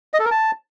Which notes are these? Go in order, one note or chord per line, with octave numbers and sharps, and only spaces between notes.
D#5
A4
A#4
A5